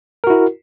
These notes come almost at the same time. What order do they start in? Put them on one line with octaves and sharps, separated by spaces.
A#4 F#4 E4